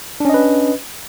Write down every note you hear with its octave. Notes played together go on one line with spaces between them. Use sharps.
C#4 D4 B4 D#5